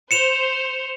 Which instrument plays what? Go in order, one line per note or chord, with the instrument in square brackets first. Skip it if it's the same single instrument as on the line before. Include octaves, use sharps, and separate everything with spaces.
[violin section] C5 [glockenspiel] C#7 E7 F7